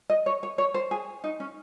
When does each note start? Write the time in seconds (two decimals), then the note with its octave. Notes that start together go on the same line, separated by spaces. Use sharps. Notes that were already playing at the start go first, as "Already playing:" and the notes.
0.10 D#5
0.26 C#5
0.43 C#5
0.58 C#5
0.74 C5
0.91 G#4
1.24 D#4
1.40 C#4